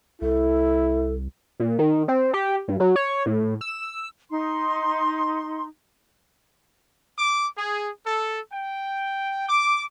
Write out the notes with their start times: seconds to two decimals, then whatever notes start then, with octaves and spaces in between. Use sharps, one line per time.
0.22 C2 E4 A4
1.60 A#2
1.79 D#3
2.08 C4
2.33 G4
2.68 G2
2.80 F#3
2.96 C#5
3.26 A2
3.61 E6
4.30 D#4 C6
7.18 D6
7.57 G#4
8.05 A4
8.52 G5
9.49 D6